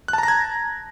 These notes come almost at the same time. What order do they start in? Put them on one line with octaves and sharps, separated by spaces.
F#6 A5 A#5 A#6 G#6